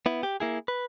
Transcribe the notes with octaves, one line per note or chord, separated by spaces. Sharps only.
B3 E4
G4
A#3 E4 G#4
B4